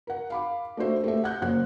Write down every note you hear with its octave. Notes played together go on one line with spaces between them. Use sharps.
A#4 F#5
F5 B5 D6
A3 D4 F#4 C5 E5
A3 G4 E5
F#5 F#6 G6
F#1 F#2 A#3 C5 F#5 F#6